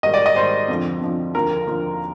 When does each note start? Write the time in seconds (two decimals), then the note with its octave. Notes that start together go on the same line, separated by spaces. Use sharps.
0.03 G#2 D#3 G3 D#5
0.14 D5
0.26 D#5
0.36 G#2 D#3 G3 C5
0.68 F2 D3 F3
1.01 F2 D3 F3
1.34 D#2 D3 F3 A#4
1.67 D#2 D3 F3